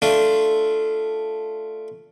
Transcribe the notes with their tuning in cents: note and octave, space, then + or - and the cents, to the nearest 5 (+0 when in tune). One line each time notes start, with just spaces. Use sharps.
A3 +0 D4 +0 F4 -5